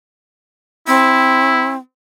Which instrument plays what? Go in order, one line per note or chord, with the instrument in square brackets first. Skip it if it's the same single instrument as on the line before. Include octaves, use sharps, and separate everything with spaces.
[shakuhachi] C4 [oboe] E4